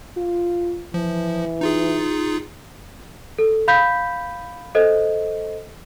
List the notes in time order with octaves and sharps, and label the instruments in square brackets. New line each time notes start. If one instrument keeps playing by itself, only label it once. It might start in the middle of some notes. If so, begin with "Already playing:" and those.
[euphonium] F4
[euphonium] E3 [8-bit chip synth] F3
[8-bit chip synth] D#4 F4 G#4
[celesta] A4
F5 B5 G6 B6
A4 C5 D#5